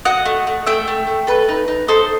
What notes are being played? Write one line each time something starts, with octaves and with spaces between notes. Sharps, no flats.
F#4 D#5 F#5
A3
A3
A3 E5 G5
A3
A3
A4 B4
D#4
D#4
D#4 A4 C5